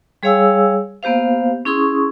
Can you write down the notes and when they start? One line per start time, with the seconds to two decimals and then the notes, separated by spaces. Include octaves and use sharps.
0.23 G3 G#4 C#5 F5 G#5 E6
1.03 A#3 B3 G4 C5 F5
1.65 C#4 E4 G#4 C6 C#6 D#6